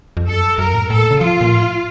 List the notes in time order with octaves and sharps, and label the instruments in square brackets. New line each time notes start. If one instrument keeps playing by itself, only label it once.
[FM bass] F2
[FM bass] F#2 [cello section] A4
[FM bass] F#2 [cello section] A#4
[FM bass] F2
A2
F#2
[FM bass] A2 [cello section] A4
[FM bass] A#2
C#3
[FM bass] F3 [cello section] F4
[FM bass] A#2
A2